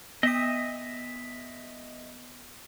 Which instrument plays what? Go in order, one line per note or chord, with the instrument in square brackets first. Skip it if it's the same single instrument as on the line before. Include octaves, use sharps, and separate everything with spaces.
[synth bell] B3 B6 [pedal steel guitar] D#5 E5 D#6